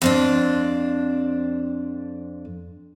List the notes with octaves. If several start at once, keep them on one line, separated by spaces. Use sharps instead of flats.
F2 C4 D4